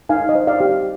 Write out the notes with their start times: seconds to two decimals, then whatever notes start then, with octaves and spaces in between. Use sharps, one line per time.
0.09 D#4 F5 G#5
0.29 D#5
0.35 C5
0.47 D5 F5
0.60 G4